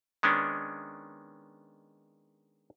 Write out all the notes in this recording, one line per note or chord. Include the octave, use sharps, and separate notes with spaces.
D#3 G#3 B3 C#4 D4